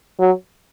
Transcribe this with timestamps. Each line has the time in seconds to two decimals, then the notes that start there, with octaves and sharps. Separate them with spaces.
0.19 F#3